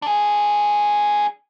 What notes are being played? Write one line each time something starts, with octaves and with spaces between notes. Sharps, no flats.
D4 G#4